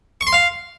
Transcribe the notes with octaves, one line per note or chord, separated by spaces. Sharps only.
C#6
C6
F5